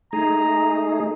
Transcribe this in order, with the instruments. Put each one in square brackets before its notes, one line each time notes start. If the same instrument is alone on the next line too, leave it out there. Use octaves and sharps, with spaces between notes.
[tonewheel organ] A3 D#4 G#4 [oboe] A#5